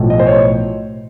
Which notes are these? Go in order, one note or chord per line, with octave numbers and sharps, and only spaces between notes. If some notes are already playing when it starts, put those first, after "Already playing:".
Already playing: B1 A2 F3
D#5
C5
C#5